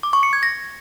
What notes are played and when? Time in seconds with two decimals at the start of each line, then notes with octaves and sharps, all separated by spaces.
0.03 D6
0.13 C#6
0.23 C#7
0.33 G#6
0.43 A#6